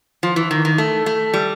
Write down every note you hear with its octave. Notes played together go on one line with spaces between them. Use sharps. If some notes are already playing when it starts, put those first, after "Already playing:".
F3
E3
D#3
D#3
A3
A3
G3